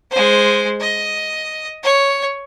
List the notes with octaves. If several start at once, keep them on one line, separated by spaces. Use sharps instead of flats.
G#3 C5
D#5
C#5